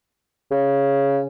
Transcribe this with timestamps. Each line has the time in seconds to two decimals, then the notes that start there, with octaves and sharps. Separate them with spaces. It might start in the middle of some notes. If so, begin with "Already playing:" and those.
0.51 C#3